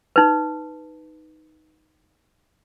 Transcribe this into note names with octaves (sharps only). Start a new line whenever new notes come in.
D#4 B4